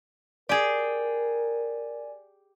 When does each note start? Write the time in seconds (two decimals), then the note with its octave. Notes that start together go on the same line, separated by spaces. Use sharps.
0.49 G4 G#4 A#4 D5 G#5